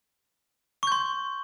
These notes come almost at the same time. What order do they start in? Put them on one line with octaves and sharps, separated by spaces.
C#6 G6 C6